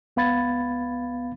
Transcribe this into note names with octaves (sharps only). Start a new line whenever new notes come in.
C#2 B3 F5 B5 G#6 A6